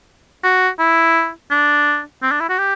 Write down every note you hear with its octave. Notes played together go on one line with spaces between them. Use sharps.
F#4
E4
D4
C4
D4
E4
F#4
G4